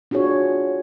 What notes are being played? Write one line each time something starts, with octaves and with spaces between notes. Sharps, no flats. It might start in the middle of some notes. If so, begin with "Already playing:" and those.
D4 F4 F#4 G#4 C#5